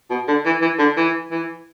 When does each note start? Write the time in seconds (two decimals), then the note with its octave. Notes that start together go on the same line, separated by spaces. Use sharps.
0.10 B2
0.28 D3
0.46 E3
0.62 E3
0.79 D3
0.97 E3
1.31 E3